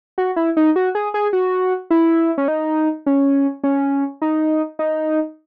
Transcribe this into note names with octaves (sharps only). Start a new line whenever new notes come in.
F#4
E4
D#4
F#4
G#4
G#4
F#4
E4
C#4
D#4
C#4
C#4
D#4
D#4